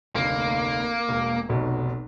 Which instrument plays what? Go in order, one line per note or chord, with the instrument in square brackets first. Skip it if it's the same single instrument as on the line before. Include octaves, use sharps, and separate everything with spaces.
[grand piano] F1 D2 [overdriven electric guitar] A#3
[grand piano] E1
F1 B1 B2